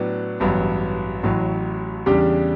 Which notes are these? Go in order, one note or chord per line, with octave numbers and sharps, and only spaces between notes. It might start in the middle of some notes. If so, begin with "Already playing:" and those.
Already playing: A2 F#3 B3 D4
A1 G2 F#3 B3
A1 A2 F#3
E2 C#3 G3 D4 G4